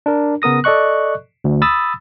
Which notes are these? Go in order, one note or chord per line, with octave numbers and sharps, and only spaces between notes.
D4 A#4
C#3 B3 A#4 D#6 A#6
A4 D5 D#5 C#6 F#6
D2
B5 D#6 E6 A6